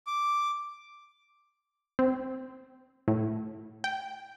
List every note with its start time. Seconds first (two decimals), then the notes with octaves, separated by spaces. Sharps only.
0.07 D6
1.99 C4
3.08 A2
3.84 G5